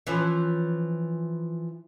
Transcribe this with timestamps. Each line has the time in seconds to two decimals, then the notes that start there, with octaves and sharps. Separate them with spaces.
0.07 E3 F3 C#4